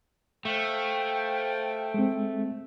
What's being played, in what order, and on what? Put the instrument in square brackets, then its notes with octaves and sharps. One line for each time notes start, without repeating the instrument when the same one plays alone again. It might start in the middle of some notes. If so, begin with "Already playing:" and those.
[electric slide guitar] A3 [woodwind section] C5 F5 G5
[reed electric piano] G#3 C4